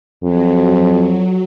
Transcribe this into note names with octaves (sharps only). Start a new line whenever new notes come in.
F2 F#3